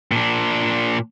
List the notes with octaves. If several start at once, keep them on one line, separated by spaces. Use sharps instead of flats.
A#2 D4